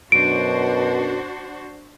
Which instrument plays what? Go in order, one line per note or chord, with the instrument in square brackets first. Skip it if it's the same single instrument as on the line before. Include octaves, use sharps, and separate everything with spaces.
[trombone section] F#2 B2 [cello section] D4 F#4 C5 [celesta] D7